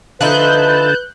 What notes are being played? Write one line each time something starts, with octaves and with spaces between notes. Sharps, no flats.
D3 F3 D#4 E4 B4 A5 F#6 G6